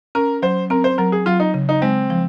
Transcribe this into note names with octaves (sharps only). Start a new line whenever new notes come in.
C#4 A#4
F#3 C5
C4 A#4
C5
F#3 A#4
G#4
F#3 F4
D#4
C#3
D#4
G#3 C4
F3